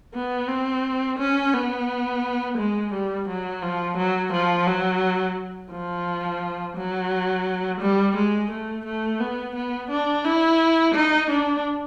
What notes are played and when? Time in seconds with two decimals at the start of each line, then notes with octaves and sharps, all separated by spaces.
0.14 B3
0.48 C4
1.19 C#4
1.54 B3
2.58 G#3
2.93 G3
3.28 F#3
3.62 F3
3.97 F#3
4.32 F3
4.67 F#3
5.71 F3
6.77 F#3
7.81 G3
8.16 G#3
8.51 A3
8.85 A3
9.20 B3
9.55 B3
9.90 D4
10.24 E4
10.94 D#4
11.29 D4